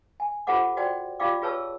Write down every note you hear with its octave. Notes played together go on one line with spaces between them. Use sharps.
G#5
F4 G4 A4 C5 F#5 D6
F#4 C5 D5 G5
F4 G4 D5 F5 G5 D6
F4 G#4 B4 C#5 A5 E6